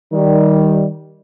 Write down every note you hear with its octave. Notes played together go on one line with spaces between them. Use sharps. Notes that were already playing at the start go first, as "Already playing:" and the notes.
D#3 G3